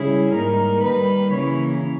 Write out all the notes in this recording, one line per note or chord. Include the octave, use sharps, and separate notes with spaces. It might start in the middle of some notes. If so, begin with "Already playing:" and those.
Already playing: C#3 G3 C#4 E4 G#4
G#2 G3 A#3 D#4 A#4
D#3 G3 A#3 D#4 B4
C#3 E3 A#3 E4 C#5